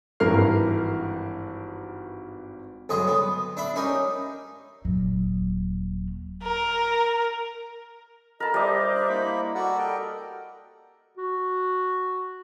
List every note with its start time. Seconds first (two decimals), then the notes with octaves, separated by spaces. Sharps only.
0.20 G#1 G2 E3 A#4 F6 C7
2.89 B1 G2 D3 G#4 D#5
3.08 B3
3.57 D4 E5 B5
3.76 C#4 D#4 G4 A#4
4.85 D#1 F#3
6.43 A#4
8.40 A4 A#4 D#5 A5 B5
8.54 G3 C5 D#5 E5 D6
8.95 D4 F#6
9.10 A#3 E4 B5
9.55 F#4 A4 D5 F#5
9.79 A#4 D#5 G5
11.17 F#4